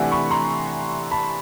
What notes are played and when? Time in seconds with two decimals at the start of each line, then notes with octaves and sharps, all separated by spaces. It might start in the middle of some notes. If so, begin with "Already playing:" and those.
Already playing: C3 E3 A3 D4 F#5 G#5
0.12 B5 C#6
0.31 A#5 C6
1.11 A5 B5